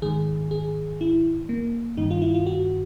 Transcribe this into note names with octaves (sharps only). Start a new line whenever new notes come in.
G#2 D#3 G#4
G#4
E4
A#3
G2 D#3 D#4
F4
E4
F4
F#4